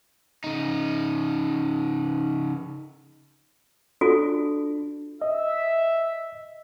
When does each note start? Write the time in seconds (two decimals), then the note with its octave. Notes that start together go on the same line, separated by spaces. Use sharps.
0.44 C#3 D#4
4.01 D4 F4 F#4 A4
5.22 D#5 E5